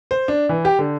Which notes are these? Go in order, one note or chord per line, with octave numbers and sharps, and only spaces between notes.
C5
D4
E3
G4
D3